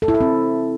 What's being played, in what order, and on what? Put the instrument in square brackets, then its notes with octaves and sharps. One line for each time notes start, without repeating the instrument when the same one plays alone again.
[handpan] A4
E4
A4
C4